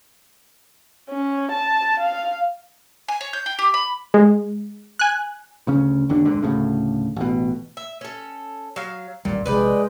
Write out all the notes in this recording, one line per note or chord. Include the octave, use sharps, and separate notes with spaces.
C#4
A5
F5
G#5
C#5
G6
G5
G4
B5
G#3
G#5 F#6
D2 C#3 C#4
G1 D#2 D3 D4
F1 G#2 D3
D2 A2 C#3
A1 B2
E5
C#4 A4
F#3 F5
A1 D#2 A#2 G3
A#1 C3 G#3 B4 D5 G5